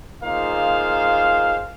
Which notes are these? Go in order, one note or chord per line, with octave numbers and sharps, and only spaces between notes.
A#3 D#4 F4 G#4 C5 F5